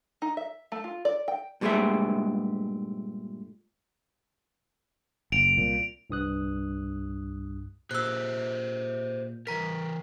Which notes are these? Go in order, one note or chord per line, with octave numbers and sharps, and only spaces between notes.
D#4
E5
A3
F4
D5
G5
G2 A#2 G#3 A3 G4 E5
F#1 D7 F7
C2 A#2
C2 G2 D#6 F#6
A#2 G4 G#4 C5 E6 F#6
E3 A#4 A#5 B6